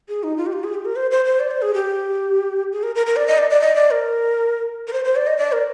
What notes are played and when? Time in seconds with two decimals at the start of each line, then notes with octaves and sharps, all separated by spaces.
0.09 G#4
0.23 D#4
0.37 F4
0.46 G4
0.53 F4
0.64 G#4
0.74 G4
0.85 A#4
0.96 C5
1.11 C5
1.25 C5
1.40 D5
1.51 C5
1.62 G#4
1.74 G4
2.72 G#4
2.83 A#4
2.95 A#4
3.06 A#4
3.16 D5
3.28 D#5
3.38 D5
3.50 D5
3.61 D#5
3.75 D5
3.91 A#4
4.87 A#4
4.93 C5
5.05 C5
5.16 D5
5.27 D#5
5.38 D5
5.52 A#4